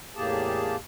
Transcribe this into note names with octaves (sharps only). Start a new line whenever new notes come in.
E2 A2 A#3 G4 G#4 A5